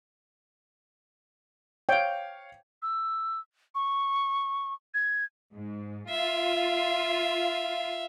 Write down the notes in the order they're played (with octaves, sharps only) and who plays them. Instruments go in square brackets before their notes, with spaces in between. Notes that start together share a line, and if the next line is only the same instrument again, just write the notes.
[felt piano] C#5 F5 [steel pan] G5
[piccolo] E6
C#6
G#6
[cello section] G#2
[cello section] F4 [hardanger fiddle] E5 F5